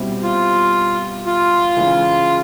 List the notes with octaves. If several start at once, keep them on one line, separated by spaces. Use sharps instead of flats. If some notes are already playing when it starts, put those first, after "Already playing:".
Already playing: B2 G3 C4 E4 G4
F4
F4
C#3 E3 G#3